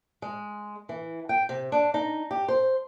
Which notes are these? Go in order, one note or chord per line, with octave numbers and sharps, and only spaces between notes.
G#3
E3
G5
C3
D4
D#4
G4
C5